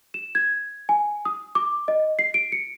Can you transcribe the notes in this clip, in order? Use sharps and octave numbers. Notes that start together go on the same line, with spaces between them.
E7
G#6
G#5
D#6
D6
D#5
C7
D7
C#7